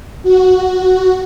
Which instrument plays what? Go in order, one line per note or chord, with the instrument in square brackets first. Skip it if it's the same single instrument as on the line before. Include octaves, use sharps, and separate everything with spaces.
[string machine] F#4